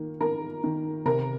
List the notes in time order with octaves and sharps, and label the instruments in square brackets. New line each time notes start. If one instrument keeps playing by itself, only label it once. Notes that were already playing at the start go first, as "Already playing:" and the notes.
Already playing: [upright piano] D#3 A#3
D#3 A#4
D#3
C3 A#4